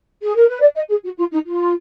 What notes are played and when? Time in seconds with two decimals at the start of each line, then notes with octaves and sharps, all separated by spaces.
0.23 G#4
0.35 A#4
0.48 B4
0.60 D5
0.75 D#5
0.88 G#4
1.03 F#4
1.18 F4
1.31 D#4
1.46 F4